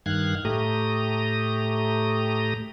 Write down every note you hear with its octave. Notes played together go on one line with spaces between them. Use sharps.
G2 D#3 F5 F#6 G#6
A2 A3 G4 A#5 D#6